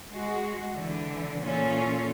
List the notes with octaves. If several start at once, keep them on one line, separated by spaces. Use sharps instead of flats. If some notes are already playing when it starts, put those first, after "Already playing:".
G#3 F#4
D3 E3
A#2 E3 C#4 F4 A4